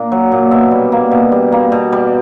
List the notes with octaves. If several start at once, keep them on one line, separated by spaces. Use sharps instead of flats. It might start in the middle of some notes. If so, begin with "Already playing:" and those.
Already playing: A#2 A#3 D4
F#3
A#2
B2 E5
G3
A#3
B2
G3
A#3
B2
G3